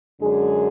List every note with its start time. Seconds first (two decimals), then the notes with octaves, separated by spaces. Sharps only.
0.20 F#2 D3 G#3 D4 G#4